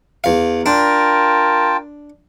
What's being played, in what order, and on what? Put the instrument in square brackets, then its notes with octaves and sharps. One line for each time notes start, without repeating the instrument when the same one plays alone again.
[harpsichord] E2 F5
[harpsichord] D4 [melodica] F4 G5 A5 [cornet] A#4